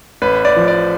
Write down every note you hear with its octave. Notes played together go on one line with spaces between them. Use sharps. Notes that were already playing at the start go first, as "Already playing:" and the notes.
A1 B4
D5
F3
D5